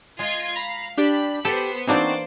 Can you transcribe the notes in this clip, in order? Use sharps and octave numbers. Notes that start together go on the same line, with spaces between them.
G#3 F4 D#5 G#6
F5 A#5 B5
D4 G4 D5 B5
B3 G4 A4 C5
E3 A#3 C4 D4 D#4 F#4 C5 D5